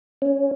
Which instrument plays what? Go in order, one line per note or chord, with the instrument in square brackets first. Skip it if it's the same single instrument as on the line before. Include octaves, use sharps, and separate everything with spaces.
[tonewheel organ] C#4